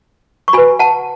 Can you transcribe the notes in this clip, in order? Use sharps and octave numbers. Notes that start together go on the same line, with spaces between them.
C#6
F#4 B4 G#5 B5
F#5 A5